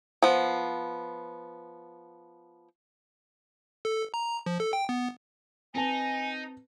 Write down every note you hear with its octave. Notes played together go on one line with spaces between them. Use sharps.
F3 B3
A4
A#5
F3
A4
G5
B3
C4 D#4 B4 G#5 A5